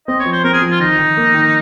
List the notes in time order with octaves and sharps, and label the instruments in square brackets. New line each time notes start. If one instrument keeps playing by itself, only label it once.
[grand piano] C4 [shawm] D#5
[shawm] C#5
[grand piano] F3
[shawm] C5
[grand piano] C4 [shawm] A#4
[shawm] G#4
[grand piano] F3
[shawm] F4
[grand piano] D#3 [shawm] D#4
[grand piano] D#3
A#3
D#3